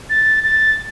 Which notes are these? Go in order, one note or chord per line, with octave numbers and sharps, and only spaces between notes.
A6
A6